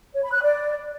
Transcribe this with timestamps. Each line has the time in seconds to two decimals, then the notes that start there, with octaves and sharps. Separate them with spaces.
0.13 C#5
0.23 B5
0.32 F#6
0.42 D5